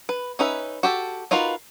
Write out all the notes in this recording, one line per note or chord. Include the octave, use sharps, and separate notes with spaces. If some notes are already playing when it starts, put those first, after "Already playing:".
B4
C#4 D#4 B4 E5
F#4 G4 A4
D#4 F4 F#4 A#4 B4